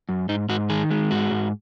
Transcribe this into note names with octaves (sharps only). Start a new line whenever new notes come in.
F#2
G#2 D#4
G#2 F#4
D#3 G#4
G#3
G#2 F#4
G#2